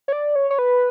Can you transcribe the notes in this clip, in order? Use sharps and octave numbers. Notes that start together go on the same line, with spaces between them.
C#5
D5
C#5
C#5
B4